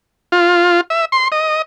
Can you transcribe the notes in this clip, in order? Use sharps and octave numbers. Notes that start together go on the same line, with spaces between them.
F4
E5
C6
D#5